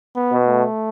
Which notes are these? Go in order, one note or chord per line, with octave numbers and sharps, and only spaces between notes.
B3
B2
A3